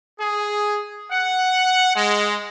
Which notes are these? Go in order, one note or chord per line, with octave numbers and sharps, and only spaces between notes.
G#4
F#5
G#3